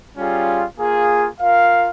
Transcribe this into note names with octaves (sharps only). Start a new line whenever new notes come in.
G3 C#4 F4 G#4
A#3 F4 G#4
F4 A#4 F5